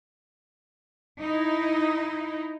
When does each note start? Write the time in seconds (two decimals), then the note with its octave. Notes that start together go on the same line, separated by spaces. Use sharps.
1.19 D#4 E4